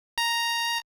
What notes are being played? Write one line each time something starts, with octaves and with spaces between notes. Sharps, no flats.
A#5